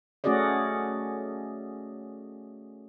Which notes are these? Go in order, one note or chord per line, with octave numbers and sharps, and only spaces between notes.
A3 C#4 F#4 G#4 D5 D#5